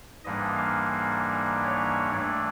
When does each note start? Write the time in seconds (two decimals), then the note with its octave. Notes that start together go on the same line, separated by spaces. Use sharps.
0.24 G#2 E3 G3 A#3 D4 D#5
0.56 F5
1.64 C#5
2.10 G2 E3 A3 D4 D5